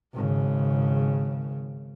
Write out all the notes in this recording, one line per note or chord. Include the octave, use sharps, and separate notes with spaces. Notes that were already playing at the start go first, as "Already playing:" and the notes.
G#1 C#3